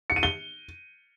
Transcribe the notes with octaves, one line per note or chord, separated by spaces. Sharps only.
C#7
D#7
G7